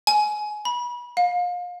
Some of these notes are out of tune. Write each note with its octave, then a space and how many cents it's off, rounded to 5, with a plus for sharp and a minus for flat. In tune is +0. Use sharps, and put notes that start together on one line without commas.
G#5 +20
B5 -30
F5 +30